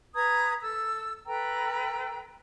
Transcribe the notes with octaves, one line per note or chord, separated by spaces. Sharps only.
B4 A#5 D#6 G#6
A4 E6
A4 B4 G5 A#5